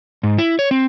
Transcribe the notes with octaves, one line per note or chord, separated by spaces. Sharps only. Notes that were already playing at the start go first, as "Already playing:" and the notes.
G#2
E4
C#5
C4